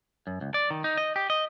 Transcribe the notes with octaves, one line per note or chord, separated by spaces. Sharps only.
F#2
C#2
D5
D#3
D#4
D#5
G4
D#5